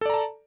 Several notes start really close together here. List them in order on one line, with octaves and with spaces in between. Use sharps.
A4 D5 A#5 A5